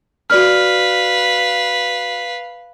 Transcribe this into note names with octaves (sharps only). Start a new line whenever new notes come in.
F#4 B4 D5 F5 F6